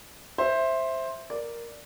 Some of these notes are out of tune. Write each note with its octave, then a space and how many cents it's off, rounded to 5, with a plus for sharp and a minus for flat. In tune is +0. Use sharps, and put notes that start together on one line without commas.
C5 +10 E5 +0
A#4 +5 D5 +0